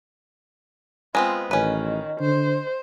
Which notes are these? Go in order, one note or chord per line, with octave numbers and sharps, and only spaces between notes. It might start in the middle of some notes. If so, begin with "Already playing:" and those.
G#3 B3 C4 F4
A1 D#3 C#4 B4
D3 C5